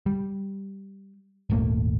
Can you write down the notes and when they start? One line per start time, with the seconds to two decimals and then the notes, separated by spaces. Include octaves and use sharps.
0.06 G3
1.50 D#1 G#1 A3 A#3